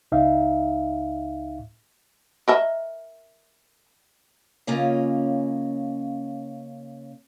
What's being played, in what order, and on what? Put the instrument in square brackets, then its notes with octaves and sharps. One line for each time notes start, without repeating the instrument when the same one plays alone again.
[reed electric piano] C#2 D#4 E5 F5
[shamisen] A#4 D#5 E5
[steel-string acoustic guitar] C#3 A#3 C#4 F4 D#5